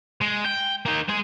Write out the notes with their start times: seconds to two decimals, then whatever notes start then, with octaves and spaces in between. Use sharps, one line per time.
0.21 G#3
0.45 G5
0.85 A#3 D#4
1.08 G#3 G#4